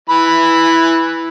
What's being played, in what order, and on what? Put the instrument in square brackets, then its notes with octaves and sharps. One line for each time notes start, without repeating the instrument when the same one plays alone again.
[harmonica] E3 B5